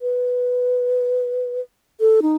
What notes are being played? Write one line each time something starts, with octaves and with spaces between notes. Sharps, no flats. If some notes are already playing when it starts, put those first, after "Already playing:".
B4
A4
D#4